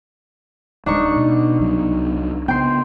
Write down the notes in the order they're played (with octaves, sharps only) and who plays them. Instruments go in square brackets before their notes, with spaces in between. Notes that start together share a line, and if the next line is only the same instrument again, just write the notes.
[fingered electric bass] D1 G#3 [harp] D4 D#4 C#6
[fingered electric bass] B2
C2 F#3 B3
[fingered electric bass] C#3 B3 [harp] G5 C6